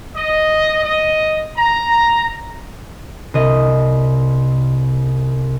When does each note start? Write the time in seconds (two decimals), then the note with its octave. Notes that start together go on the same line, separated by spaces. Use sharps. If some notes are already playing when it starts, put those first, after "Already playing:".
0.16 D#5
0.84 D#5
1.56 A#5
3.34 C2 D#5